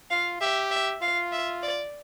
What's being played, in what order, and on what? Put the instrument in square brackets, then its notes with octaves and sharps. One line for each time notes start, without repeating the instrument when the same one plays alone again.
[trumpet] F4 [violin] F5
[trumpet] G4 [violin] E5
[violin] E5
[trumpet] F4 [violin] F5
[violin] E5
D5